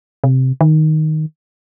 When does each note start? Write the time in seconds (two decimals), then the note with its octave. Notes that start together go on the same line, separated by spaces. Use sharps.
0.24 C3
0.61 D#3